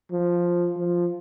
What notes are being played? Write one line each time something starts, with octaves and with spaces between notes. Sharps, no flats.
F3
F3